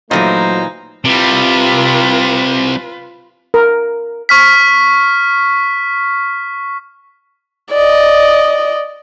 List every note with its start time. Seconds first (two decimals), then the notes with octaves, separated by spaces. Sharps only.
0.11 A#2 D#3 E3 F#3 A3 D#4 C5
1.05 C3 G3 F4 B4
3.54 A#4
4.29 C#6 F6 B6
7.71 D5 D#5